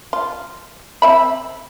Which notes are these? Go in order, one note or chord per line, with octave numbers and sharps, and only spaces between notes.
F4
C4 E5 B5